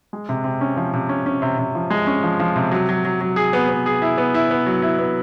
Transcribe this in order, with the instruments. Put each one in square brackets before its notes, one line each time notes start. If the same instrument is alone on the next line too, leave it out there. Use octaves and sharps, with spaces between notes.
[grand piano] G#3
C3
C3
C#4
F3
C3
C#4
C#4
C3
C3
F3
G#3
C#4
F3
F3
C3
F#3
F#3
F#3
F#3
G#4
B3
B3
G#4
E4
B3
E4
B3
F#3
E4
B3